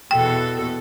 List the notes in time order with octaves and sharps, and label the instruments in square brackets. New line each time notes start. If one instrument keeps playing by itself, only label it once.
[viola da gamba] E2 B2 A4 [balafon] G5